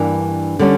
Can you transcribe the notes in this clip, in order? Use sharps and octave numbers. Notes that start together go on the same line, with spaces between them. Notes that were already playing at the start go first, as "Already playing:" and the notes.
Already playing: G2 E3 A#3 D4
D3 G3 C#4